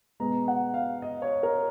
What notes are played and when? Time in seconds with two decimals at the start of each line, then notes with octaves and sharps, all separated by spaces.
0.20 B2 G#3 B3 A#5
0.48 F#5
0.74 F5
1.02 D#5
1.22 C#5
1.43 A#4